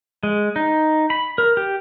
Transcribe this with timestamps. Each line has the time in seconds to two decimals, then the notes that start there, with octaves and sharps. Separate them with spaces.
0.23 G#3
0.56 D#4
1.10 B5
1.38 A#4
1.57 G4